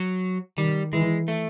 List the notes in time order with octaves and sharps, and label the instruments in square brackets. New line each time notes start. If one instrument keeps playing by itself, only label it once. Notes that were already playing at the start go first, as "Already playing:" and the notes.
Already playing: [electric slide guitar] F#3
[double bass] D#3 [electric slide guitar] G3
[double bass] E3 [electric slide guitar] G#3
[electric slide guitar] A3